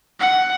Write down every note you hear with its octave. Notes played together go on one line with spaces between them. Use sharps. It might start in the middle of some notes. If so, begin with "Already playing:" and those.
F#5